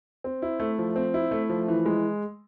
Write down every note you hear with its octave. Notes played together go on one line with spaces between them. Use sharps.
C4
E4
A3
F3
C4
E4
A3
F3
E3
G#3